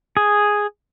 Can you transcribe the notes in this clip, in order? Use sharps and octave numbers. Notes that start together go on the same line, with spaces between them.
G#4